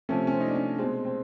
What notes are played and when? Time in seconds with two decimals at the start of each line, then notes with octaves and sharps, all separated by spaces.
0.09 C3 F3 A3 C#4
0.27 C#4
0.32 C4
0.40 D#4
0.48 D4
0.56 C#4
0.78 B2 G#3 C4
1.05 C4